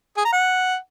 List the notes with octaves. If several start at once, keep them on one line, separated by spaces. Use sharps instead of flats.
G#4
A#5
F#5